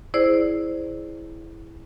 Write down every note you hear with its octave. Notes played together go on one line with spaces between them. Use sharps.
E4 G#4 C5 D5